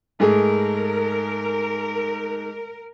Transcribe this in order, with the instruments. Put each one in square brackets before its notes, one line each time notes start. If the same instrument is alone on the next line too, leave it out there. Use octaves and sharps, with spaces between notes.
[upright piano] G#2 A3 G#4 [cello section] A#4